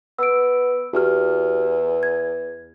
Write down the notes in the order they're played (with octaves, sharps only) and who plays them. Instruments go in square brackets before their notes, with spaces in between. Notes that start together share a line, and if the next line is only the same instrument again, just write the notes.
[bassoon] B3 [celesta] E6 D7
[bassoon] E2 [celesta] F#4 G4 F6
[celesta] G#6